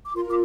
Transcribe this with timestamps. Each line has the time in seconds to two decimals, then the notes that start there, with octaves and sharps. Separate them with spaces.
0.05 D6
0.15 F4 A#4 C6
0.30 D6